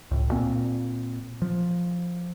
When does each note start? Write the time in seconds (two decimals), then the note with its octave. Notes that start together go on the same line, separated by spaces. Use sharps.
0.11 C#2 A2
0.31 A#2 A#3 C4
1.42 F3